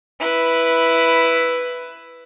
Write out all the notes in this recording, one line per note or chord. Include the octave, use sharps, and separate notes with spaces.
E4 B4